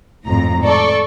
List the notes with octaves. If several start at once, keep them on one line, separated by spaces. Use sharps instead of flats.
G#1 F2 A2 A#5
A4 D5 C#6